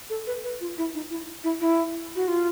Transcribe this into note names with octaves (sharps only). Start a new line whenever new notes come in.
A4
B4
B4
F4
E4
D#4
E4
E4
E4
F#4
F4